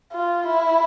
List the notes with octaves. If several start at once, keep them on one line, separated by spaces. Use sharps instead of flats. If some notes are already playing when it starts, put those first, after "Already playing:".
F4
E4